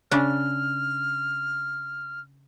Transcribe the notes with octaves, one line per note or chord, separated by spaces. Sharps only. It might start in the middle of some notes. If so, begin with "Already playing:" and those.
C#3 D4 F6